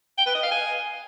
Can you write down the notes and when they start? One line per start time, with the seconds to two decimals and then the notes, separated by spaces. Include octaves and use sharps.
0.18 G5
0.27 B4
0.35 D#5
0.43 F5
0.51 G#5